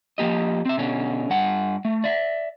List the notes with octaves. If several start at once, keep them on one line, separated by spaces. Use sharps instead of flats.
F3 A#3 G4 D#5
C4 E5
B2 D3 C#4
G2 F#5
A3
D5 E5